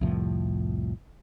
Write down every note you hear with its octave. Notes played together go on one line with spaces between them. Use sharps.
C2 F2 A2 F3